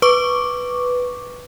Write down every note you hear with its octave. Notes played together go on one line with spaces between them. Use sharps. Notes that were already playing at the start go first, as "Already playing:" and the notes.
B4 C#6 D6